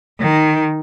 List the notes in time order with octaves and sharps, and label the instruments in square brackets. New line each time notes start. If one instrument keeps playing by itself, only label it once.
[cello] D#3